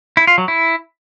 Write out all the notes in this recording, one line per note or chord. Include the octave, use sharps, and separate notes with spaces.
E4
F4
F#3
E4